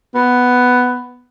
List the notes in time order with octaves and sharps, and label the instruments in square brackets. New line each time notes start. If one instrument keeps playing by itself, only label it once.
[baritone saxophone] B3